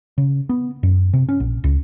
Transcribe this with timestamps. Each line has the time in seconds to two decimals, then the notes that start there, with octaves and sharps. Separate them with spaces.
0.18 C#3
0.49 B3
0.83 F#2
1.13 C3
1.29 C#4
1.40 A#1
1.64 C#2